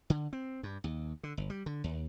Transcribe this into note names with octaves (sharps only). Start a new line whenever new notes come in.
D3
C4
G2
D#2
D3
G1
G3
D3
D#2